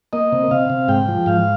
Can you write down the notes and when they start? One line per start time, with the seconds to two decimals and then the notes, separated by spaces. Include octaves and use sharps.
0.13 A#3 D#5
0.32 C3
0.51 C3 F5
0.70 C3
0.88 G#2 G5
1.08 F3
1.26 G#2 F5